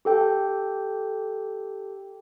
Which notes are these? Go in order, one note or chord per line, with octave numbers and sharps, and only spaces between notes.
G4 A4 G5